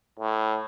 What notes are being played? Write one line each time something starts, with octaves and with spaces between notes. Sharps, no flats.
A2